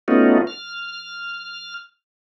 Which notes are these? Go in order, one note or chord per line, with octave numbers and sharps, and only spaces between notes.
A3 B3 C#4 D#4 F4 F#4
F6